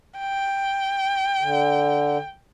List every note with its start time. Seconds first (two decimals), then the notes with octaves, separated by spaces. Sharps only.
0.19 G5
1.41 D3